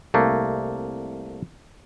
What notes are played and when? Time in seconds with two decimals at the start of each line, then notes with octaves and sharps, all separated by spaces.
0.14 C2 A3 A#3